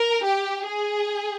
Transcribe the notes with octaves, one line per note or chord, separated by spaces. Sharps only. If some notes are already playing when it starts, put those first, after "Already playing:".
Already playing: A#4
G4
G#4